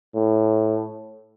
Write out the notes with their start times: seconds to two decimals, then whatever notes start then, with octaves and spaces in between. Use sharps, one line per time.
0.15 A2